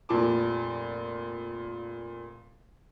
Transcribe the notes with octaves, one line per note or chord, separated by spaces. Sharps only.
F1 A#2 F3 A5 D6